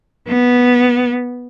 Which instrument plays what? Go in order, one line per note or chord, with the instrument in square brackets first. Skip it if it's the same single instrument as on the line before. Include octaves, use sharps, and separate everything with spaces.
[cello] B3